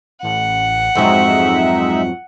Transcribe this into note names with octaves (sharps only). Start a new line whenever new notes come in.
A1 F#5
F2 G#2 F#3 G#3 D#4 E5